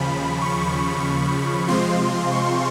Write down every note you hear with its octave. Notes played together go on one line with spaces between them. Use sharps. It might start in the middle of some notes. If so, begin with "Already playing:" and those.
Already playing: D#2 C#3 F3 B5
C#6
C3 F3 G#3 C4 F4 C6
C#6